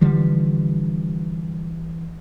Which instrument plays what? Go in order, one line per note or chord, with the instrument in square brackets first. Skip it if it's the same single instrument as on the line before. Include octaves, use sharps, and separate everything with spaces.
[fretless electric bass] D3 F3 G3 [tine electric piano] E3